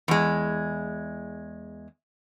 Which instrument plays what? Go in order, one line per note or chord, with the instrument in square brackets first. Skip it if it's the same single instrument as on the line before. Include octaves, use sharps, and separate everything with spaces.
[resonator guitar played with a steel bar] E2 G#3